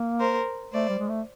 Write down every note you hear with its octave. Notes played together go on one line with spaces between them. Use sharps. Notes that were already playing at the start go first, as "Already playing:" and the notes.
Already playing: A#3
A#4 C5
A3 C5 D5
G3
G#3
A3